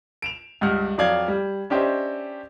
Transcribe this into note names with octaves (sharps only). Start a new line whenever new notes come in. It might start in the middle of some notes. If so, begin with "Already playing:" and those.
D7 E7 F7
C#2 G2 F#5 F6
F2 F#3 D5 F5 G#6
G3
C#4 D4 G4 C5 D#5 E5